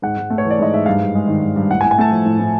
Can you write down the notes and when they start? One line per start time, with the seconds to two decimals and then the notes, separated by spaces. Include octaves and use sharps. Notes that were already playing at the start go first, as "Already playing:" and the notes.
0.02 G#2 F#5
0.17 G#2
0.30 A3
0.38 C#5
0.45 E3
0.51 D5
0.59 G#2 D#5
0.73 G#2 E5
0.86 G2 F5
1.00 G2
1.15 G#3
1.28 D#3
1.42 G2
1.56 G2
1.70 A2 F#5
1.81 G#5
1.85 A2
1.91 G#5
1.98 A3 A5
2.12 F3
2.26 A2
2.39 A2